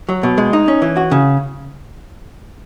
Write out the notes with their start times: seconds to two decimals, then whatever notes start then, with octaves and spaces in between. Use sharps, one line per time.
0.09 F#3
0.23 B2
0.38 G#3
0.53 D#4
0.68 C#4
0.82 E3
0.97 F#4
1.11 C#3